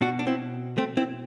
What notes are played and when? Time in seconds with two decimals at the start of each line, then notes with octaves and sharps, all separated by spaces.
0.01 B2 D4 F#4
0.19 D4
0.27 C4 E4
0.78 A3 C4
0.97 C4 E4